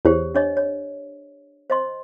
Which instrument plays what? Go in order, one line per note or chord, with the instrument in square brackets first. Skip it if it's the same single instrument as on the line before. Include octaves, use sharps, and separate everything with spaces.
[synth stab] E2 [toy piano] G4 C5 C#5
[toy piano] D4 C#5 D#5
C#5
C5 D#5 C6